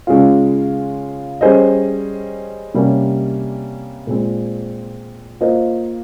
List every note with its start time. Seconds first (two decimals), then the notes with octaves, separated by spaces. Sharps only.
0.07 C#3 G#3 C#4 F4
1.41 G3 C#4 G#4 C5 D#5
2.74 C3 G3 A#3 C#4
4.07 A#2 G#3 C4
5.41 A#3 F4 C5 D#5